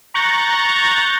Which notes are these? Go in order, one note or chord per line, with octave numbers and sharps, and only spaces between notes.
A#5 C#6 F#6 G6 A6 A#6